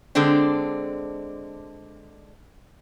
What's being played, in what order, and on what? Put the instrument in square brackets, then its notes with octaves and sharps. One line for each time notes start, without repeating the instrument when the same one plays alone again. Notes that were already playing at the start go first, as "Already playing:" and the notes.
[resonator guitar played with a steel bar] D3 G#3 C4 D4